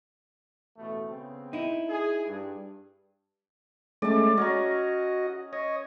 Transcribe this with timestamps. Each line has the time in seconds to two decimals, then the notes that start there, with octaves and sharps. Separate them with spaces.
0.77 A1 B2 A3
1.08 C#3 B3 C4
1.53 D#4 E4
1.89 G#4
2.27 G2
4.02 G#3 A3 C#4 D5 A5
4.38 C#4 F#4 D#5 A#5
5.53 C#5 D#5